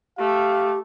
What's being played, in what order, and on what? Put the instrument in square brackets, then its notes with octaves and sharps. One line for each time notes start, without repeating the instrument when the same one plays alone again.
[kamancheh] A3 [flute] G4 [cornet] F5